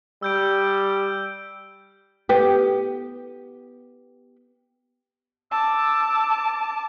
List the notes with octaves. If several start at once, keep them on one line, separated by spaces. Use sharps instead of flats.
G3 E6 G6 D7
B3 G4
A5 D6 E6